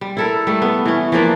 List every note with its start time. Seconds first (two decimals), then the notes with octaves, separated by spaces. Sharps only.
0.01 G3
0.17 E4 A4 A#4
0.47 G3 A3
0.62 B3
0.85 E3 C#4
1.12 E3 F3 A#3 D4